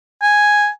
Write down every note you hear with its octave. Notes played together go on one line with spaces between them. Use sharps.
G#5